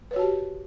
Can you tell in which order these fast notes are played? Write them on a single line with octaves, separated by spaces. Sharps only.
B4 C#5 F#4 A5 G4